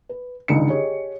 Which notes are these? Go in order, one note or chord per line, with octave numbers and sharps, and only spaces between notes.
B4
G#1 C#2 D3 D#4 C#7
G4 G#4 C#5 D#5